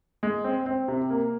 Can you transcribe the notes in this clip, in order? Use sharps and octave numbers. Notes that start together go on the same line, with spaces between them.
G#3
C4
C4
C3
A#3